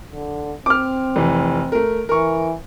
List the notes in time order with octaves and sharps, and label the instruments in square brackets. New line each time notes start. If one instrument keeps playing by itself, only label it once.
[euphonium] D3
[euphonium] C4 [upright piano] D6 F6
[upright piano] F1 E3
A3 A#4
[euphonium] E3 [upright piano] A#4 C#6